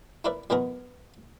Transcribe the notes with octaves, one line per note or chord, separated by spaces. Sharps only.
E4 A#4 B4 D5 E5
F#2 E3 G#3 B3 G#4 A#4